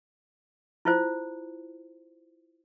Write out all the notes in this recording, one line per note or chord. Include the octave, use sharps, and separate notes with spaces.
E4 F4 C5